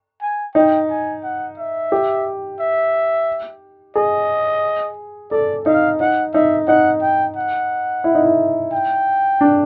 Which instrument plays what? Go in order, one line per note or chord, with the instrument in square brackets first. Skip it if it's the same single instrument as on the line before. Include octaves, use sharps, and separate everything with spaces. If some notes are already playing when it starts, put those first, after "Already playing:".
[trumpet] G#5
[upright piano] D#4 [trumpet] G5
[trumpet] G#5
F#5
E5
[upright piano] G4
[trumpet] E5
[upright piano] G#4 [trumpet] D#5
[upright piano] A4 [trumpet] D5
[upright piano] D#4 [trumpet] F5
[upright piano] D#4 [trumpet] F#5
[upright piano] D#4 [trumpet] E5
[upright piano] D#4 [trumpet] F#5
[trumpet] G5
F#5
[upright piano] E4
D#4
E4
[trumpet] G5
[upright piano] D4